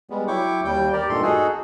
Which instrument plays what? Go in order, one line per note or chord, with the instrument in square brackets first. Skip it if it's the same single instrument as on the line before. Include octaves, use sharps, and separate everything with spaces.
[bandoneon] G3 G#3 B3
F#3 E4 G5 C#6 D6
D#2 G3 G5 G6
G4 A#4 D5
G2 A#2 D#3 A3 A4 C6
D#4 F#4 G#4 A4